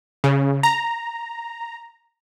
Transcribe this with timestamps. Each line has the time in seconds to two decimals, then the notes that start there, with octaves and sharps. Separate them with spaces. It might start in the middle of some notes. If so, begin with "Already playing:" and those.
0.24 C#3
0.63 A#5